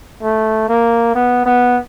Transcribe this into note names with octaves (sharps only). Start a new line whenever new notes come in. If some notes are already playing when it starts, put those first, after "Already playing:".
A3
A#3
B3
B3